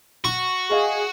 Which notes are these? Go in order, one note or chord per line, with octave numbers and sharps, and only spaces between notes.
F#4 C#6
G#4 D#5 F5